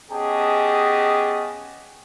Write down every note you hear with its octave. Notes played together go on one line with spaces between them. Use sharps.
B3 C#4 G4 G#4 D#5 A5